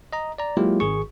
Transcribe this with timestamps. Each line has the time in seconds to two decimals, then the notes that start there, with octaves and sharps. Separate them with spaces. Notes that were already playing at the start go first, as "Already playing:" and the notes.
0.13 D#5 A#5
0.38 D5 A#5
0.57 F#3 G#3 A#3 E4 F4 G4
0.80 G#1 G#4 C#6